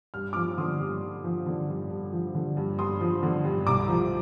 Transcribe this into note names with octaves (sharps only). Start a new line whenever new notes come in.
G2 F6
F3 D6 F6
D3 C6 D#6
G2
G2
F3
D3
G2
G2
F3
D3
G2
G2 C6 D#6
F3
D3
G2
C2 A#5 D6
F3